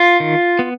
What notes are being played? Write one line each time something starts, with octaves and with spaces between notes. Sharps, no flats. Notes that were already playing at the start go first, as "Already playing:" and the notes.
Already playing: F4
D#3
B3